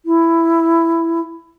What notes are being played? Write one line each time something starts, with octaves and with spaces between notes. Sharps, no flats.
E4